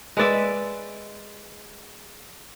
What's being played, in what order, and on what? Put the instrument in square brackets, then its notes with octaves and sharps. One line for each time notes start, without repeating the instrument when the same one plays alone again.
[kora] G#3 B4 D5 E5